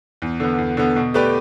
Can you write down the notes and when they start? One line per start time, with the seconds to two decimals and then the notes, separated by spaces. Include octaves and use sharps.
0.22 E2
0.40 D3 B3
0.58 E2
0.77 D3 B3
0.96 B2
1.14 A3 G4 B4 D5